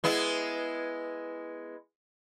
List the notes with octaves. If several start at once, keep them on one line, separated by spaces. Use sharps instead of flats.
G#3 B3 E4